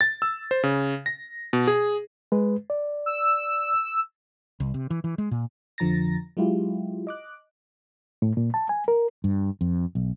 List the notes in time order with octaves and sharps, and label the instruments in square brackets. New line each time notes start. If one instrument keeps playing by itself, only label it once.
[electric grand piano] A6
E6
C5
C#3
A#6
B2
G#4
[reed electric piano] G#3 B4
D5
[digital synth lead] E6
[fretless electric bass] C2
C3
E3
E3
G#3
A#2
[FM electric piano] F2 D3 F3 A#5 A6 A#6
F#3 G#3 E4 F4 G4
D#5 D6 F#6
[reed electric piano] A2
A#2
A5
G#5
A#4
[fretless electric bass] G2
F2
B1